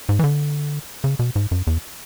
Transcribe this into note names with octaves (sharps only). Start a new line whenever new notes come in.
G#2
E3
D3
C#3
B2
G#2
F#2
E2